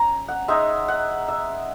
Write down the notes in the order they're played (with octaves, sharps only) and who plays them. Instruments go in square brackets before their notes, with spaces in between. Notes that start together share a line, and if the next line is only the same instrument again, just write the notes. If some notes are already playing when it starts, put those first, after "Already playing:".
Already playing: [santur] C#4 A#5
F#5
G#3 D#4 E5
F#5
E5